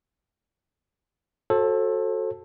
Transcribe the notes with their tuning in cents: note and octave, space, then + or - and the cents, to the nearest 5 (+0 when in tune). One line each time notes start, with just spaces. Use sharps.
F#4 -10 A4 +0 C5 +40